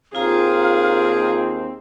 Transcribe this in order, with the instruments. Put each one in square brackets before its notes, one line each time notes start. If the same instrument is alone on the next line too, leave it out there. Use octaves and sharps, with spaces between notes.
[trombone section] D#2 C4 [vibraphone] F4 A#5 [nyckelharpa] G#4 [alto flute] F5